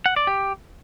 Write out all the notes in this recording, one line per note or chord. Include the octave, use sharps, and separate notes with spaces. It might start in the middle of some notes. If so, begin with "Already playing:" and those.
F#5
D5
G4